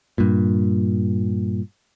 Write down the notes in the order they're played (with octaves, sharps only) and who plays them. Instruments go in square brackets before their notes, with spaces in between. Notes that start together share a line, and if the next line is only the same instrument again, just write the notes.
[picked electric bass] G2 A#2